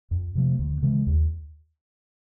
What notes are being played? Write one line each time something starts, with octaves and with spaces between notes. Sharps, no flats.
F2
C3 F3 A3
D2
C#3 E3 G#3
D#2